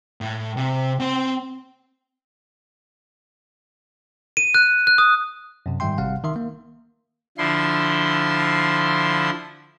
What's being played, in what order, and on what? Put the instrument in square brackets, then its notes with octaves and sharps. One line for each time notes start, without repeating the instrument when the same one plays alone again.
[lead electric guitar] A2
C3
C4 C6
[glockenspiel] D#7
F#6
F#6
D#6
[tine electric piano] F#2 C3
G#2 D#3 G3 E5 G5 C6
G#1 C3 G3 C4 F5 F#5
D#3 E5 C6
A#3
[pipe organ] D3 F3 E4 C6